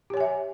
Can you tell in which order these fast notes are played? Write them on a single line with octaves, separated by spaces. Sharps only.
G4 C#5 G#5 E5